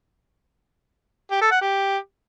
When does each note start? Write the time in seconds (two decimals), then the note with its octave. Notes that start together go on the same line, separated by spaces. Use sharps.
1.31 G4
1.41 A4
1.51 F#5
1.62 G4